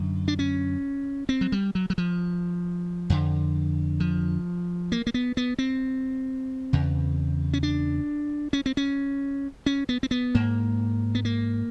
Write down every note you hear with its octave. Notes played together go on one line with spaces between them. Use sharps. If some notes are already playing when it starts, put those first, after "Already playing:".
Already playing: F#2 D3
D4
C#4
C4
F#3
G3
F#3
F#3
F3
F2 D3
F3
A#3
A#3
B3
B3
C4
E2 C#3
C#4
D4
C#4
C4
C#4
C#4
B3
C4
B3
G#2 A#3
B3
A#3